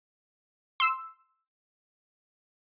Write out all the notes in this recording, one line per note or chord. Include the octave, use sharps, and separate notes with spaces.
C6 E6